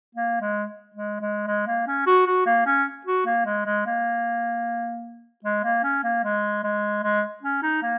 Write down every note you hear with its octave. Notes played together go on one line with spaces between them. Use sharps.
A#3
G#3
G#3
G#3
G#3
A#3
C#4
F#4
F#4
A#3
C#4
F#4
A#3
G#3
G#3
A#3
G#3
A#3
C#4
A#3
G#3
G#3
G#3
C#4
D#4
A#3